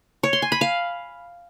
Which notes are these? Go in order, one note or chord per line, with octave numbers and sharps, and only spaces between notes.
C#5
C6
G#5
B5
F5